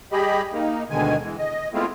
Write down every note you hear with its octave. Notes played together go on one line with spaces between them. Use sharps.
G3 G4 G#4 D#5 B5
A#3 D#4
D2 B2 D3 D#3 G#3 G#5
E3 G#3
D#5
G#3 A3 B3 C4 E4 F4